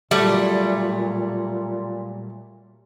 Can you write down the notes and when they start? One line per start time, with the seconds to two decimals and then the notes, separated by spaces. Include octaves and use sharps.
0.11 A#2 F#3 G3 A3